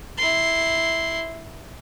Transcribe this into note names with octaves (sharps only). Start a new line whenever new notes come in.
E4 C6